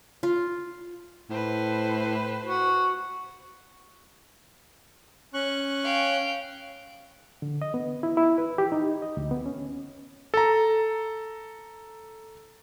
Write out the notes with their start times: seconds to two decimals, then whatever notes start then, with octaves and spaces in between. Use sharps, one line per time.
0.23 F4
1.30 A2 B4 C5
2.45 F#4
5.34 C#4 C#6 F#6
5.83 F5 G5
7.42 D3
7.62 D#5
7.74 B3
8.03 E4
8.17 E4
8.38 B4
8.58 G4
8.72 D#4
9.02 D#5
9.17 D2
9.31 B3
9.46 C#4
10.34 A4 A#5